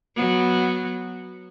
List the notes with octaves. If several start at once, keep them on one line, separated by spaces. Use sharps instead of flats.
F#3 B3